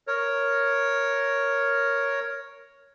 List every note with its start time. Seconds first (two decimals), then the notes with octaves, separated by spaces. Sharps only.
0.07 A#4 C#5